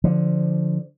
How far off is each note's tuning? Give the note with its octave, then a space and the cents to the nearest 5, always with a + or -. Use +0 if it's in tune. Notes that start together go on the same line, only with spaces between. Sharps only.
D3 +0 F3 +0